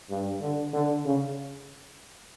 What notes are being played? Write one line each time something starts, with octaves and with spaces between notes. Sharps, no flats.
G2
D3
D3
C#3